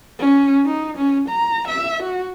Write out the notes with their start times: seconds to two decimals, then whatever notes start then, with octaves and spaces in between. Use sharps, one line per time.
0.19 C#4
0.66 D#4
0.97 C#4
1.29 A#5
1.68 E5
2.03 F#4